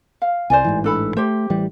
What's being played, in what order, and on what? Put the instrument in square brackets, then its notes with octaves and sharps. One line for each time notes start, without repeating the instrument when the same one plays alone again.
[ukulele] F5
[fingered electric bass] C2 [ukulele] C5 D5 G#5
[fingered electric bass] A1 G#2 E3
[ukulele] D4 A4 B5
[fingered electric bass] A3 [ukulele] G4 C5
[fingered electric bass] A1 E3 G3